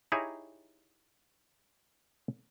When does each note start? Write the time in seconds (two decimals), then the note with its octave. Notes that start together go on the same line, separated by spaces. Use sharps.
0.12 D#4 E4 G4 G#4 C#5 A#5